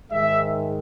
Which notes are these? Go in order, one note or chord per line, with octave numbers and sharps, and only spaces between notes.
G#2 D#3 G#3 E5